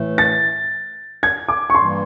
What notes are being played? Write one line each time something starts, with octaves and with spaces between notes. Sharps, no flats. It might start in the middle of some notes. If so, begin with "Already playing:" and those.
Already playing: A2 E3 A3
A6
G#6
D6
C#6
G2 E3 G3 A#3 C6